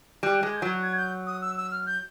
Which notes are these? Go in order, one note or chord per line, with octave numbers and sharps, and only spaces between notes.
G3 F#6
G#3
G#6
F#3 G6
G#6
G6
D#6
E6
E6
F6
G6